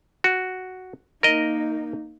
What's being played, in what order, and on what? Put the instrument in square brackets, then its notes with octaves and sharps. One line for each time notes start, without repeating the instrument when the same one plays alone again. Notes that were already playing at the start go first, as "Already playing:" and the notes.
[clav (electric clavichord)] F#4
[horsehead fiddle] A#3 D#4 [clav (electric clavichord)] A#4 D#5